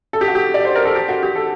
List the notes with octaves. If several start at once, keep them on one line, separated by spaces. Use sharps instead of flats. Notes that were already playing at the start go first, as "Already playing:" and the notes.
A4
G4
F#4
G4
D5
C5
A#4
A4
G4
F#4
G4
A4